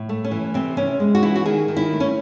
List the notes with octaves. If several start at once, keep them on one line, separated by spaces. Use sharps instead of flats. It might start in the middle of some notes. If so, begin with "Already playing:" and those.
Already playing: A2
A3
C#4
E3
C3 C4
C3 C#4
G#3
F#4
E3 E4
F#4
D#3 G#4
D#3
E4
A3
C#4